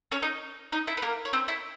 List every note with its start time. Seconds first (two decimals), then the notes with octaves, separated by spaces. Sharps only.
0.12 C#4 C#5
0.22 D#4 D#5
0.72 D#4 D#5
0.87 E4 E5
0.97 B4
1.02 A#3 A#4
1.25 C#5
1.33 C4 C5
1.48 E4 E5